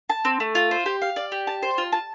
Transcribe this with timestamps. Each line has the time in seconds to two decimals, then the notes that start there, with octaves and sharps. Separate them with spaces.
0.10 A5
0.25 C4
0.40 A3
0.55 F4
0.71 C5
0.86 G4
1.02 F5
1.16 D5
1.32 G4
1.47 A5
1.62 C5
1.78 F4
1.92 A5